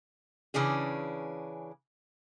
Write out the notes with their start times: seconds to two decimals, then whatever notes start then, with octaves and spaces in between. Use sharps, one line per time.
0.54 C#3 E3 C#4 D4 G#4